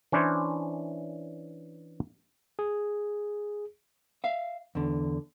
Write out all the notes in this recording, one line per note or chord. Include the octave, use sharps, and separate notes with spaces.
E3 C#4 D4 E4 C5 C#5
G#4
E5 F5
E2 D3